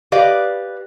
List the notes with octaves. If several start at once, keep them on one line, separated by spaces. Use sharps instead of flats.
G4 B4 D5 D#5 F5